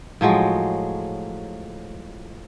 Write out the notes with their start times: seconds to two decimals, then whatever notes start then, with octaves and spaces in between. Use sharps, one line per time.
0.21 A2 F3 F#3 G#3